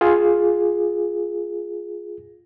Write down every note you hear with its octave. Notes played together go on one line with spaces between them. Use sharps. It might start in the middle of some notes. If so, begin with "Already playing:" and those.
F4 G#4